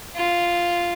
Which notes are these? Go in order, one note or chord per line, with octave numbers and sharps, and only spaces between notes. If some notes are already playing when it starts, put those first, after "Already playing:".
F4